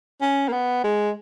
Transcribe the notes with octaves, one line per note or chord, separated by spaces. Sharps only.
C#4
A#3
B3
G#3